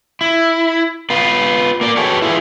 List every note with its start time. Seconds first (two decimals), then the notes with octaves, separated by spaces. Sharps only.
0.21 E4
1.10 B3 F4 B4
1.81 A#3 D5
1.97 F#4 G#4 A4 B4 C#5 G5
2.22 E4 F4 G#4 B4